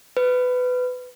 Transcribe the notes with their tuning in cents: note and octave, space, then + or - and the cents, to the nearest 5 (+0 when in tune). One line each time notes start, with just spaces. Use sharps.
B4 +20